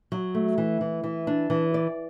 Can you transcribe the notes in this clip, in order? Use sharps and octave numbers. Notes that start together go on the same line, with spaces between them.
F#3
A3
E3
E3
E3
D4
E3
D5